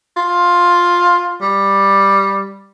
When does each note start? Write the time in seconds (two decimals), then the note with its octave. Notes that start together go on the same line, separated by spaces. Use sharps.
0.16 F4
1.41 G3